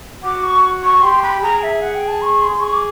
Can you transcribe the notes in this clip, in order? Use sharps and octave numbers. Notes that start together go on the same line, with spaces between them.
F#4 D6
C#6
C#6
G4 C6
B5
G#4 A#5
E5
F#5
G5
A5
C#6
C6
G#4 C#6
D6